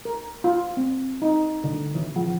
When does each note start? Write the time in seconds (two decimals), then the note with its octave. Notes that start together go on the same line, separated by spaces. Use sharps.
0.05 A#4
0.44 F4
0.77 C4
1.22 D#4
1.64 D3
1.95 E3
2.16 F3